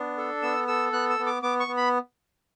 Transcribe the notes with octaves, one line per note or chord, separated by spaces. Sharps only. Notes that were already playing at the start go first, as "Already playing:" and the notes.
Already playing: B3 D4
A4
B3 E6
A4 E6
B3 F#6
E6
B3
D6
B3 D6
C#6
B3
B5